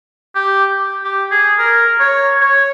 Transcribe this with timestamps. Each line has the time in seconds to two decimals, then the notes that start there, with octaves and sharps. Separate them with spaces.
0.35 G4
1.04 G4
1.31 G#4
1.59 A#4
2.00 C#5
2.41 C#5